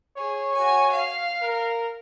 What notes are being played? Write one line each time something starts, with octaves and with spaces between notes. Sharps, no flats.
G#4 C#5
F#4 G#5
F5
A#4